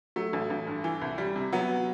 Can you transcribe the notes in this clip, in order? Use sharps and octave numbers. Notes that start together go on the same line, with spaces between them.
F#3 A3
A1
A1
G2
E3
C2
G3
C3
F#3 B3